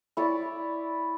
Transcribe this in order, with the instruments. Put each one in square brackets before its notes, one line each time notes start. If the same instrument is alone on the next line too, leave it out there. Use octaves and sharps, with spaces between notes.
[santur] E4 C#5 D5